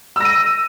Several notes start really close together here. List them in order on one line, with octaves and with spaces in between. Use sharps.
E6 A#6 D#7